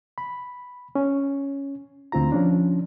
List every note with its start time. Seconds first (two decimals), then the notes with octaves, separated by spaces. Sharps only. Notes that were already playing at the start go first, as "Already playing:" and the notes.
0.18 B5
0.95 C#4
2.12 D2 C4 F4 A#5
2.32 F3 C#4 D4